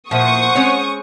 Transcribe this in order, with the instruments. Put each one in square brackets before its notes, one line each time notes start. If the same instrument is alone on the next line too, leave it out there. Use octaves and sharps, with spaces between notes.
[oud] A#2 E4 [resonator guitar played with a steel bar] F3 [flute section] C5 F#5 [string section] C#6 D#6
[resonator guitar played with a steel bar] G#3 C4 C#5 [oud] C#4